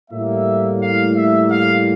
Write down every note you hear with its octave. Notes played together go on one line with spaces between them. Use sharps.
A2 G3 A#3 E5
F5
E5
F5